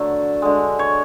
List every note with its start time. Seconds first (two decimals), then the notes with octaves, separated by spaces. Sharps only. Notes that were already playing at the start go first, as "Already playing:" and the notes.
Already playing: D3 F#3 A3 A4
0.42 D3 G#3
0.79 C#5